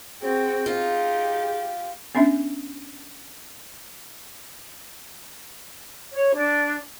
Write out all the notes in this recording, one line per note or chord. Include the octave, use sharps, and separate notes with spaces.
C4 F#4 G#4 G5
D#4 F4 G4
B3 C#4 D4 E5
C#5
D4